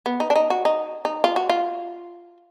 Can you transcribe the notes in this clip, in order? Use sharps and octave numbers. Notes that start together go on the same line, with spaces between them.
B3
D#4
D4
D#4
F#4
D#4
D#4
F4
F#4
F4